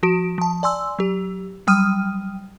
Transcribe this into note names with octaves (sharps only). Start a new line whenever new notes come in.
F3 F#4 D7
F3 A5
D5 G#5 C6 E6
F#3 G4
F#3 G3 G5 D#6 F6 D#7